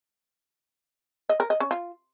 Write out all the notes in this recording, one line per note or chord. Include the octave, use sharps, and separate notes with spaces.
D#5
A#4
D#5
C#4
F4